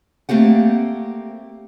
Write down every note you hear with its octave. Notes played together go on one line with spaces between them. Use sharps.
A3 A#3 C4 G4 F#5